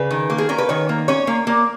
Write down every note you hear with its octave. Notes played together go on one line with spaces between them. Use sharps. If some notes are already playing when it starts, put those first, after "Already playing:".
Already playing: C#3 B4
D#3
A#3
G#4
C#4 A#4
B4
D#3 C#5
A#3
C#4 C#5
A#3
A#3